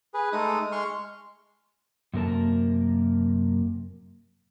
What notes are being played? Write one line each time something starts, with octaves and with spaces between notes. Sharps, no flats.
G#4 B4
G#3 A3 D#4 D#6
G#3 C6 C#6 F6
F#2 C3 A#3 A#4 A5